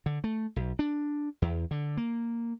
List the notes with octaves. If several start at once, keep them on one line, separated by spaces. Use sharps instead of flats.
D3
A3
B1
D4
E2
D3
A#3